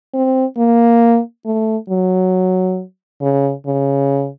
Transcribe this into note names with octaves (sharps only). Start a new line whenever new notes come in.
C4
A#3
A3
F#3
C#3
C#3